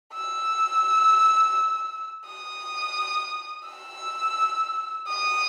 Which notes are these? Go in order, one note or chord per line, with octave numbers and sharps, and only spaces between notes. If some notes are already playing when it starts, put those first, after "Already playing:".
E6
D#6
E6
D#6